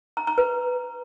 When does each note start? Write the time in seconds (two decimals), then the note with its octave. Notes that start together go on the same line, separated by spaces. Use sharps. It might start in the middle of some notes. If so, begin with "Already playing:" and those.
0.17 A#5
0.27 A#5
0.38 B4